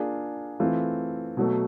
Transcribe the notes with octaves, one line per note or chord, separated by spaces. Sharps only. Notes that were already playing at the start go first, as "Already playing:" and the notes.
Already playing: A#3 D4 F4 G#4
E3 A3 C4 F4
B2 F#3 A3